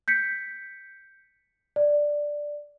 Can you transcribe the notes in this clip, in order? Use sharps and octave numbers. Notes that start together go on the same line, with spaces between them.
G6 B6 C#7
D5